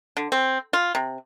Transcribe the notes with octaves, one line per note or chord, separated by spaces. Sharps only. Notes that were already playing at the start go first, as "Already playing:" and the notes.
D3
C4
F4
C3